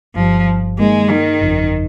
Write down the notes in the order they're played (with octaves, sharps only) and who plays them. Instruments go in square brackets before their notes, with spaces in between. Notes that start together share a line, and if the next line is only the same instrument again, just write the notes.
[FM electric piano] G1 G2 G3 [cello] F3
[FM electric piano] G2 D#3 A#3 D#4 G#4 [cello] G#3
[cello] D#3
[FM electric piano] G1 F2 C#3 F3